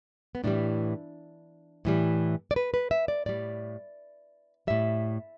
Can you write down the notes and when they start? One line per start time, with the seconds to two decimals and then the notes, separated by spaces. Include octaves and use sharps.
0.35 B3
0.44 A2 E3 G3 D4
1.85 A2 E3 G3
2.51 D5
2.56 B4
2.74 B4
2.91 E5
3.08 D5
3.26 A2 G3 D5
4.67 A2 G3 E5